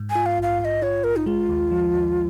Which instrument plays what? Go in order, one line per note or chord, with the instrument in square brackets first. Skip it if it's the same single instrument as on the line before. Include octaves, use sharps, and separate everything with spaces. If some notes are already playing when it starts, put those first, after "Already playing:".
Already playing: [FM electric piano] G#2
[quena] G#5
[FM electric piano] F4
[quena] F5
[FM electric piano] A#1 [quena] F5
[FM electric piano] A#1 [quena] F5
[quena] D#5
[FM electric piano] F4 [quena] C#5
[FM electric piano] A#1 [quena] A#4
[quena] D#4
[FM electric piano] G#3 [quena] F4
[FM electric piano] D#2
F3
D#2